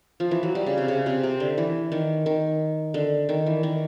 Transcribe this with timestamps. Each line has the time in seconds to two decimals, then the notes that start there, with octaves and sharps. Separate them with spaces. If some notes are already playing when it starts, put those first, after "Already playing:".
0.20 F3
0.31 E3
0.43 F#3
0.55 G3
0.66 C#3
0.78 C3
0.88 C#3
1.06 C3
1.23 C3
1.40 D3
1.58 E3
1.92 D#3
2.26 D#3
2.94 D3
3.29 D#3
3.46 E3
3.63 D#3